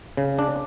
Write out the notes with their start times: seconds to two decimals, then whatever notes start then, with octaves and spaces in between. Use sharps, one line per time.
0.17 C#3
0.39 D4